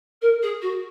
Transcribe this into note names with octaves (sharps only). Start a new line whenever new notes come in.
A#4
G#4
F#4